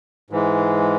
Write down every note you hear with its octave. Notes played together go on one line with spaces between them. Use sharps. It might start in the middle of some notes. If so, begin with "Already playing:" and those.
G#2 E3 G#3